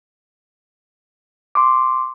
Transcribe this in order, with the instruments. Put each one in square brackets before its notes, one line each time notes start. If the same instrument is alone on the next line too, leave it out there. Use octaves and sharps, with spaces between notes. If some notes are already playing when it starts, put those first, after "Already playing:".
[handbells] C6 D6